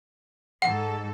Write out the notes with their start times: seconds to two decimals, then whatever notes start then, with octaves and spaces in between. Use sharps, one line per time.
0.62 G#2 A4 F#5